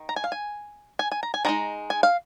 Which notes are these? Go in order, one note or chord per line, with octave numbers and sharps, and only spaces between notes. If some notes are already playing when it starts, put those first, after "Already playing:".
Already playing: D#3
A#5
G#5
F5
G#5
G#5
G#5
A#5
G#5
D#3 G#3 D#4 A#5
G#5
F5